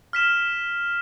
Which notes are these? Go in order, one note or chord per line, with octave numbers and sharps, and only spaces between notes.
F6 B6 E7